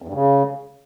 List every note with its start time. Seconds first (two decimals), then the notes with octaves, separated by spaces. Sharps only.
0.02 E2
0.08 G2
0.14 C#3